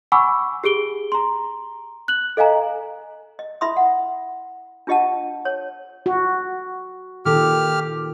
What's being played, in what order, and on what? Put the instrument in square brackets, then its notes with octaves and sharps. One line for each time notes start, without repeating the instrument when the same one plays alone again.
[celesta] F#5 G#5 B5 C#6 D6 E6
G4 G#4 D7 G7
A#5 C6
F#6 F#7
A4 D#5 F5 G#5 A#5
[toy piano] D#5
E4 E5 B5 C6 D#6
F#5
D4 F4 G4 D#5 F#5 A5
C#5
[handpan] F#4
[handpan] A#2 D#3 A4 [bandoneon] G4 F6